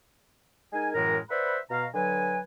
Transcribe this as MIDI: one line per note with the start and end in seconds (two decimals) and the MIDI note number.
0.73 0.91 56
0.73 0.91 63
0.73 0.91 70
0.73 0.91 80
0.94 1.19 42
0.94 1.19 45
0.94 1.19 52
0.94 1.19 56
0.94 1.19 70
1.30 1.58 71
1.30 1.58 72
1.30 1.58 74
1.30 1.58 76
1.30 1.58 78
1.30 1.58 83
1.70 1.86 47
1.70 1.86 77
1.70 1.86 82
1.94 2.39 50
1.94 2.39 54
1.94 2.39 71
1.94 2.39 80